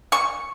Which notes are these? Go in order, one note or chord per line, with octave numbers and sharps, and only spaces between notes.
C#6